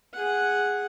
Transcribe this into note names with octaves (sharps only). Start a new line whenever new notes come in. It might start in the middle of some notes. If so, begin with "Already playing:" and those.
G#4 F#5